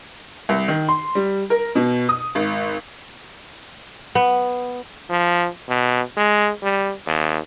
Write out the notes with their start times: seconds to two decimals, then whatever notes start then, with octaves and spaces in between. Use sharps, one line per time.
0.49 C2
0.68 D#3
0.88 C6
1.15 G3
1.50 A#4
1.75 B2
2.09 D#6
2.35 G#1
4.15 B3
5.10 F3
5.69 B2
6.17 G#3
6.63 G3
7.07 D#2